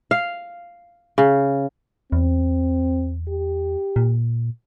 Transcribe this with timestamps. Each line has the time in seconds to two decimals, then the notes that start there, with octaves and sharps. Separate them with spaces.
0.11 F5
1.18 C#3
2.12 E2 C4
3.28 G4
3.96 A#2